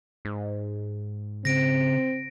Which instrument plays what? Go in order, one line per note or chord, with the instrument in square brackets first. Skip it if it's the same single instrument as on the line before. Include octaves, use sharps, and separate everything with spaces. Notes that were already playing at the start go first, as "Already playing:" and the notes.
[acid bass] G#2
[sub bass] C#3 [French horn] C4 [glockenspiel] A#6 D7